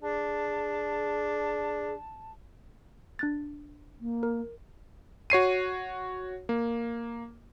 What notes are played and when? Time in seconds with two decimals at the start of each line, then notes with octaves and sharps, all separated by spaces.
0.02 D4 G#4 A5
3.19 D4 F#6 A6
4.00 A#3
4.23 A#4
5.30 F#4 C#5 C7 D#7
6.49 A#3